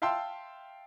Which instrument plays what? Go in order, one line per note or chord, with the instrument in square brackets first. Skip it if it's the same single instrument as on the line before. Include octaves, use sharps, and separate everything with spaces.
[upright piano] E5 F5 G5 A5 C6 E6